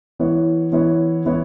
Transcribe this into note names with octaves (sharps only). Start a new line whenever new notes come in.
E3 B3 E4 C#5
E3 B3 E4 C#5
E3 B3 E4 C#5